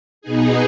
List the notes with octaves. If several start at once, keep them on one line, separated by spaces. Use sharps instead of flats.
B2 B3 D#4 G#4